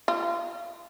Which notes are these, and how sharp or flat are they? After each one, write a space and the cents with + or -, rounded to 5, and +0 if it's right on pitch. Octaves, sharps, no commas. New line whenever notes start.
F4 -30